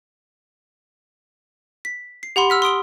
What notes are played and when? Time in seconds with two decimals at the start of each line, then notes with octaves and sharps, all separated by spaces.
1.85 B6
2.23 C7
2.36 G4 F#5 B5 C6
2.50 E6 F6 B6
2.62 C6 D#6 D7 G7